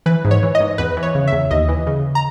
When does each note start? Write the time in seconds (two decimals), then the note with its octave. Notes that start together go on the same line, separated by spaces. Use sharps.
0.06 E3 B4
0.25 G#2
0.31 C#5
0.43 E3
0.55 D#5
0.60 G#2
0.78 E2 B4
0.97 E3
1.03 C#5
1.15 C#3
1.27 E2 E5
1.51 D#2 D#5
1.69 E3
1.87 C#3
2.15 A#5